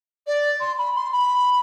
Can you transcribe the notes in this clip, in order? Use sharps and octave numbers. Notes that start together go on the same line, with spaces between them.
D5
C6
B5
C6
B5